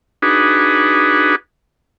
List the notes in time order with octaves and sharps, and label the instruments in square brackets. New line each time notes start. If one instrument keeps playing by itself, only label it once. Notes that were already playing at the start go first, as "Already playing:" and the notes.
[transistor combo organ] D4 D#4 F#4 G#4 B4